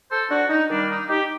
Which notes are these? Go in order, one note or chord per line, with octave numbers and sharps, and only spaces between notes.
A4 C5
D4 F#4
D#4
D#3 G3 A#3 D4
D#4
D#4 G4